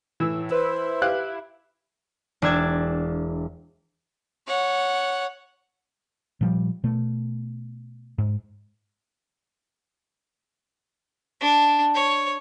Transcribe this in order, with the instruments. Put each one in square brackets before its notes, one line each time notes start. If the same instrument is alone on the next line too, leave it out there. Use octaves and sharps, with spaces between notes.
[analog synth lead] A2 [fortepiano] E3 [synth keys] E6
[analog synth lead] E4 [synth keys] B4 E6 [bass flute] C5
[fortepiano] G4 F5 F#6
[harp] E1 D4 E6 G#6 A6
[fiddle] C#5 F#5
[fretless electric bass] A#2 F3 G3
B2 A3
G#2
[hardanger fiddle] D4
C#5